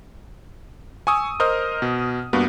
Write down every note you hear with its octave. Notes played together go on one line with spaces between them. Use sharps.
G#5 C#6 D#6 E6
A#4 C5 D#5 D#6 F6
B2
G2 A#3 B3 F#4